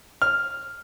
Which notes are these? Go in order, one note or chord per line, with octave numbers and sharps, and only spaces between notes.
F6